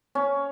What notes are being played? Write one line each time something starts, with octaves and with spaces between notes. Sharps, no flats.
C#4